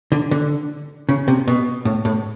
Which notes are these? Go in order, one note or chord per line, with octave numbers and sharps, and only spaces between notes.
D3
D3
C#3
C3
B2
A2
A2